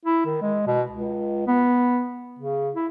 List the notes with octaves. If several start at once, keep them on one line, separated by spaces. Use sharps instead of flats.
E4
D#3
G#3
B2
C#2
B3
C#3
E4